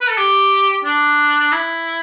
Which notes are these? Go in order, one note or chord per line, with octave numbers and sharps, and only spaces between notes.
B4
A4
G4
D4
D4
E4